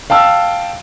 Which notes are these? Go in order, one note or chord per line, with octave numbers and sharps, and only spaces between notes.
F5 G5 A5 E6